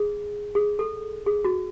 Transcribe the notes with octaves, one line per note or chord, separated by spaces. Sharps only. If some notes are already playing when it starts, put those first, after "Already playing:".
Already playing: G#4
G#4
A4
G#4
F#4